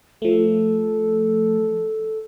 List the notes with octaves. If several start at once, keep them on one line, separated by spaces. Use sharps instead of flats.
F3 A3 A4